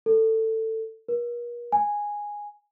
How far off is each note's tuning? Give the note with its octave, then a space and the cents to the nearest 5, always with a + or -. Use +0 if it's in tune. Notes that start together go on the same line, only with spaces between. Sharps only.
A4 +15
A#4 +45
G#5 -5